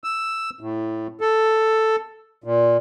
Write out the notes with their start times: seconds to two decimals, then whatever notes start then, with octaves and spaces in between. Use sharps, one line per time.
0.04 E6
0.61 A2
1.21 A4
2.44 A#2